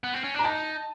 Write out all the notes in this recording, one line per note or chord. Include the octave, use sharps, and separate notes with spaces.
B3
C4
C#4
D4 A#5
D#4 A5